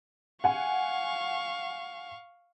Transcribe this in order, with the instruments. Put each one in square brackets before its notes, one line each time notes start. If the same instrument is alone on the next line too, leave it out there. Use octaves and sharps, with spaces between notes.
[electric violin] F5 C#6 [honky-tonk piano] F#5 G#5